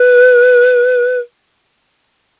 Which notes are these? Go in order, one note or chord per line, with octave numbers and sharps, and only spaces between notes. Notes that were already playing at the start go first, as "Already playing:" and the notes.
Already playing: B4